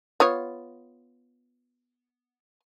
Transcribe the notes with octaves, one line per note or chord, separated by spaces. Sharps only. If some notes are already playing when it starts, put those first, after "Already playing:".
B3 F4 C#5